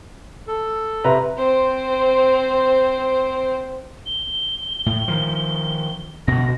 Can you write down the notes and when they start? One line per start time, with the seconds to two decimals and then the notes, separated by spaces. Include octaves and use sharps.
0.48 A4
1.04 C3 B4 A#5
1.38 C4 C5
4.06 G7
4.86 A2
5.08 D#3 F3
6.28 D2 B2 A#6